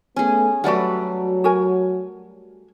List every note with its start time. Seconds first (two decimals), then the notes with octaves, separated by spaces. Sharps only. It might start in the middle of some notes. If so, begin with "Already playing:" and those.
0.16 A3 B3 C#4 G#4
0.64 F#3 G3 A3 F#4 B4 D5 F#5
1.44 F#4 A#4 G#5